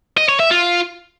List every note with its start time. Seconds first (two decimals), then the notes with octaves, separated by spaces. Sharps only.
0.17 D#5
0.28 C#5
0.40 E5
0.51 F4